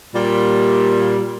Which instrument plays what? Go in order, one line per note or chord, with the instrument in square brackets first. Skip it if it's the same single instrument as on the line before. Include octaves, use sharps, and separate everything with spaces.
[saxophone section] A#2 G3